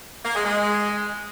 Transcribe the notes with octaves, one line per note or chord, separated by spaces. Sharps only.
A#3
G#3
G#3